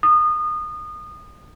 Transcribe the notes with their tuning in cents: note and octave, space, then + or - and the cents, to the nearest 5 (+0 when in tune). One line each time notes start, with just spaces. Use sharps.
D#6 -25